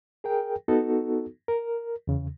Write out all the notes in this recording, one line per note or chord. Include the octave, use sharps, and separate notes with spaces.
G#4 A#4 G5
B3 D#4 F#4 A4
A#4
E2 C#3